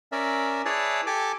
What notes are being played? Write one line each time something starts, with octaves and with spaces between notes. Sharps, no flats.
C#4 A#4 D5 E5
E4 G#4 B4 C#5 D5 A5
G4 A4 G#5 A5 D6